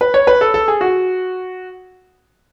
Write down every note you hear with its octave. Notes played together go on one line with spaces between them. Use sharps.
B4
C#5
B4
A4
A4
G#4
F#4